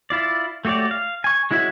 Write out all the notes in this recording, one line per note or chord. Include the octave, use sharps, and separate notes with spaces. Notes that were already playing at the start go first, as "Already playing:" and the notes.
E4 F4 D5
A3 F#4 G4 C#5 D5
F5
G#5 C#6
G#3 E4 F#4 C#5 E5